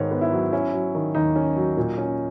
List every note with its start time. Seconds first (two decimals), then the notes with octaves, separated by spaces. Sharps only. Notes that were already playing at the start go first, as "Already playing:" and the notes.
Already playing: G#2 D#3 B3 C#5
0.11 B3
0.21 E4
0.32 F#3
0.53 C#4 E4
0.74 F#3
0.95 D#3
1.15 D#2 D#4
1.36 C#4
1.56 F#3
1.77 A#2
1.98 C#4